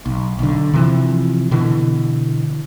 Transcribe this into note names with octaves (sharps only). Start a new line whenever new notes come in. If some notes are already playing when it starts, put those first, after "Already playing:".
B1
B1 D3
C3 E3 F3
B2 D3 E3